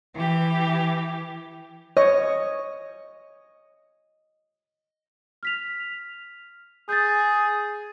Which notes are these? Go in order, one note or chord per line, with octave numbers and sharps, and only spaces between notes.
E3 G4
C#5 D#5
F6 B6 F7
G#4 G6 A6